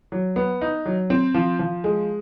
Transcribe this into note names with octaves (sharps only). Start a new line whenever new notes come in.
F#3
B3
D#4
F#3
C4
F3
F3
G#3